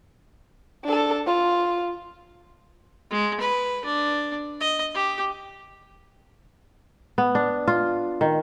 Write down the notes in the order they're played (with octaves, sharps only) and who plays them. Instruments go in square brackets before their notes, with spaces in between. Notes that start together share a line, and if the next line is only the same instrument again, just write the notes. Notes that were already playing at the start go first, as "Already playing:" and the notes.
[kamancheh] D4 A4
F4
[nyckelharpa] G#3
B4
D4
D#5
G4
[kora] B3
D4
F4
D#3